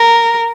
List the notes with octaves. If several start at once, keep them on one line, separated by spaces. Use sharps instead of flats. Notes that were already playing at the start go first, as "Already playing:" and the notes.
Already playing: A#4